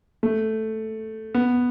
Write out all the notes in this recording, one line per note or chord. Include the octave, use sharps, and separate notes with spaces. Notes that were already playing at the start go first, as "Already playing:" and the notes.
A3
B3